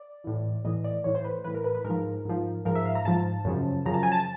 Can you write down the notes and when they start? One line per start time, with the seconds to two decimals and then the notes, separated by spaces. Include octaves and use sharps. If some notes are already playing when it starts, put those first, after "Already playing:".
Already playing: D5
0.24 A2 E3
0.65 A2 E3 D#5
0.84 D5
1.04 A2 E3 C#5
1.15 C5
1.24 B4
1.44 A2 E3 B4
1.55 A#4
1.64 B4
1.75 B4
1.84 G#2 A#4
1.90 F3
2.25 G#2 F3
2.65 G#2 F3 A#4
2.75 E5
2.85 F5
2.95 A#5
3.05 G#2 F3 A5
3.45 F#2 C#3 F3
3.86 F#2 C#3 F3 A#5
3.94 A5
4.03 G#5
4.12 A5